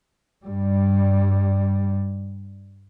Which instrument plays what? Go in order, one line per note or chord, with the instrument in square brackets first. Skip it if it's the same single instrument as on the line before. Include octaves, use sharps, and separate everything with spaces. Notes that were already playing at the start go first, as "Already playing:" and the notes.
[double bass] G2 G3